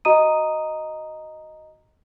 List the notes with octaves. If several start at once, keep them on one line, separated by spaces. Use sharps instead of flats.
F#4 D#5 A#5 D#6 D#7